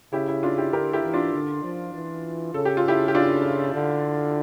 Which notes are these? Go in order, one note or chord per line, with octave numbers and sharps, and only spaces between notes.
C#3 E4 G4
E4
D4 F4
E4 G4
D3 G4 A#4
E4 G4
E3
D4 F4
D3
F3
E3
C#3 A4
G4
F4
E4 G4
G4
D4 F4
D3